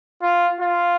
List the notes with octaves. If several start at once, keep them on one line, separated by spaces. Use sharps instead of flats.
F4
F4